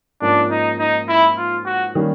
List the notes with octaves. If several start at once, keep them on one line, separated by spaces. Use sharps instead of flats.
G#2 F3 A#3 C#4 D4
D#4
D#4
E4
F4
F#4
D#3 G3 A#3 C#4